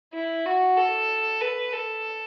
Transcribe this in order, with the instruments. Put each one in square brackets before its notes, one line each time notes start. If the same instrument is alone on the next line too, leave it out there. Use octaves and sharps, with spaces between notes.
[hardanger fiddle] E4
F#4
A4
B4
A4